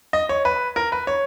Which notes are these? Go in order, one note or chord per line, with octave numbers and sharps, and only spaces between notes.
D#5
C#5
B4
A#4
B4
C#5